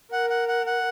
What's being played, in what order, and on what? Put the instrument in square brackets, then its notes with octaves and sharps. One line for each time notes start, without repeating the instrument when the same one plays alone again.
[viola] A#4 [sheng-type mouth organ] F#5
[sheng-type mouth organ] F#5
F#5
F#5